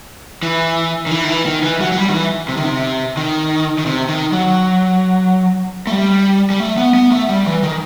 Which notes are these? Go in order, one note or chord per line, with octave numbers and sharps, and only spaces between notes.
E3
D#3
E3
D#3
E3
D#3
E3
F#3
F#3
G3
D#3
E3
C3
D#3
C3
D#3
D#3
C3
D#3
F#3
A3
G3
G3
A3
B3
B3
A3
G3
E3
D#3